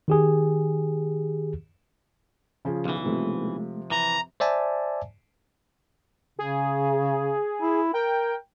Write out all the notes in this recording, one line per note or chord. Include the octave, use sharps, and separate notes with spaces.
D#3 G4 G#4
C#3 F3 G#4
B1 E3 F4
C3 F3 G#3 A3
E3 A#5
C5 D5 E5 G#5 A5
C#3 G#4
E4
A#4 G5